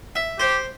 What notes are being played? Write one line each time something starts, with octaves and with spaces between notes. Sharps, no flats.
E5
G4 C5